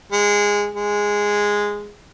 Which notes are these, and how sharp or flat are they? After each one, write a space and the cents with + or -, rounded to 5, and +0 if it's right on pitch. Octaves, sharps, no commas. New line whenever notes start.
G#3 -15
G#3 -10